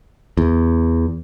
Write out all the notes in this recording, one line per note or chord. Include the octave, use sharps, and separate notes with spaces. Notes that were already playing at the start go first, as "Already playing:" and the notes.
E2